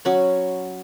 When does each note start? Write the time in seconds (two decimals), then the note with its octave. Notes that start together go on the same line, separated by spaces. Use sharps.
0.05 F#3 C#4 B5